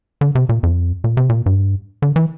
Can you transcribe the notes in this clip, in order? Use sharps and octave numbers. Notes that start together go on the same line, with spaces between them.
D3
C3
A#2
F2
A#2
C3
A#2
G2
D3
E3